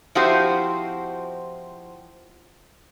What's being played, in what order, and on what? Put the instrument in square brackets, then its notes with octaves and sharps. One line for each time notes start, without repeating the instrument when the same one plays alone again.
[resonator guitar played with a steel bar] F3 C4 E4 F#4 G4 C5